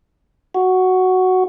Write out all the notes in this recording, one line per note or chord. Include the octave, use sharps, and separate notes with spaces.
F#4